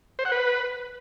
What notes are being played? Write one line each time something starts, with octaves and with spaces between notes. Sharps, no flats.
C5
F#5
B4